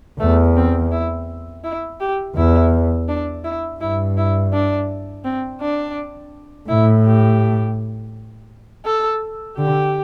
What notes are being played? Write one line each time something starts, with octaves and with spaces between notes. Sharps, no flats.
E2 A3
C4
E4
E4
G4
E2 E4
D4
E4
G2 E4
E4
D4
C4
D4
A2 E4
G4
A4
D3 G4